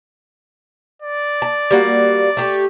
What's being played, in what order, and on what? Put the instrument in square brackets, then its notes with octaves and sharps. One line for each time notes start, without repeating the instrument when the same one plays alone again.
[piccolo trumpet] D5
[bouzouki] A5
G3 A#3 F#4
A3 G4